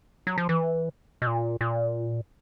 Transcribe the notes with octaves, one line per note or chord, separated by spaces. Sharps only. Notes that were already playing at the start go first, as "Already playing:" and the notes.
F#3
F3
E3
B2
A#2
A#2